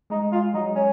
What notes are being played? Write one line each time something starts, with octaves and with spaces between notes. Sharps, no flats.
G#3 D#4
G#3 F4
F#3 D#4
C#4